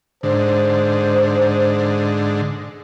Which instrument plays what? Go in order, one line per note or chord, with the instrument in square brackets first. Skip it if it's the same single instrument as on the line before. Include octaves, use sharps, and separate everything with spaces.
[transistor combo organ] G#2 D3 [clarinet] C5